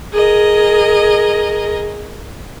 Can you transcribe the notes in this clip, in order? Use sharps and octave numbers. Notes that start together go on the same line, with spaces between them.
G#4 A#4 D#5